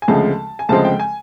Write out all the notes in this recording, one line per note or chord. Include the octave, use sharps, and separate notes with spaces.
G#5
D2 C#3 F3 G#3 C4 A5
G#5
D2 C#3 F3 G#3 C4 A5
G5
G#5